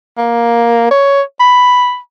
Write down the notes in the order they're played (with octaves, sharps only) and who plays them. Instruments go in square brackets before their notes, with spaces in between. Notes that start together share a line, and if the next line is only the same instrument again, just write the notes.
[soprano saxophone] A#3
C#5
B5